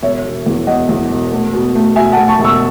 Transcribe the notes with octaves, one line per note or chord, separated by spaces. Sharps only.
E1 C#5 E5
E1
E2
E1 D#5 F#5
E2
E1
A3
B2
A3
B2 E5 G#5
F#5 A5
A3
A5 C#6
E1
C#6 E6